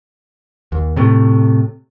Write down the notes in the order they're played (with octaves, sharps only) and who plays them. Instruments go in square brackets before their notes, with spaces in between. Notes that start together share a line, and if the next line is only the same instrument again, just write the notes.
[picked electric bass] D#2
A2 C3 A3